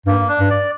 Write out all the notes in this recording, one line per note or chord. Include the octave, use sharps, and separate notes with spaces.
G2 A#3
D4
G2
D5